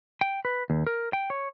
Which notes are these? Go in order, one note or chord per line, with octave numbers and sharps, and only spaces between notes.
G5
B4
D#2
A#4
G5
C#5